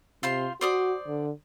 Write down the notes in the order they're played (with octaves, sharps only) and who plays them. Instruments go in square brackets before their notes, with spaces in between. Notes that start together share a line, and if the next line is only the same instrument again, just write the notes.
[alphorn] C3 [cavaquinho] F4 C5 C6
[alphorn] F#4 [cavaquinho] C5 D5 D#6
[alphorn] D3